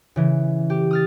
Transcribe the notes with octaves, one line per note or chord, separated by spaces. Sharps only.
C#3 E3
G4
D#6 F6 A6